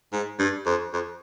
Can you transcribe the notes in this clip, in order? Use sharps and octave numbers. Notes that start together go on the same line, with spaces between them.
G#2
G2
F2
F2